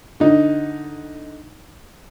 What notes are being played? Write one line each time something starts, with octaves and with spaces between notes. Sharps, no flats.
D3 D#4